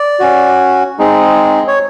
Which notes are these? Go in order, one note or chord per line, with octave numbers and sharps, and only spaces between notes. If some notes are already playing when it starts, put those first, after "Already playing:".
Already playing: D5
C#4 F#4
G#3 C4 D#4 G#4
C#5